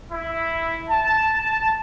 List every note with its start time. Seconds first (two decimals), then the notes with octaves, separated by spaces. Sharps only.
0.12 E4
0.90 A5
1.36 A5